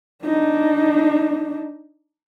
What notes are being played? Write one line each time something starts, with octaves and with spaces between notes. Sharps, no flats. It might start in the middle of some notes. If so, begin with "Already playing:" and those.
D4 D#4